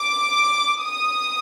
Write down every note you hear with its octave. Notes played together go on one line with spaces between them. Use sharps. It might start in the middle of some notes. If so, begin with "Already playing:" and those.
Already playing: D6
D#6